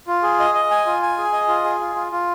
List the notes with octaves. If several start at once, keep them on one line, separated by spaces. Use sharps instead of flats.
F4
G#4
D#5
D#5
G#5
F4
G#5
G#4
D#5
F4
G#4
F4
F4
F4